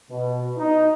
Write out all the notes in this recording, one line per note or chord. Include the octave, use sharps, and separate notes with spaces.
B2
D#4